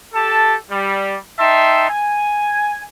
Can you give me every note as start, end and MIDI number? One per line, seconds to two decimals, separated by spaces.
0.14 0.54 67
0.14 0.54 69
0.14 0.54 81
0.70 1.15 55
1.39 1.87 63
1.39 1.87 76
1.39 1.87 79
1.39 1.87 81
1.39 1.87 84
1.89 2.82 80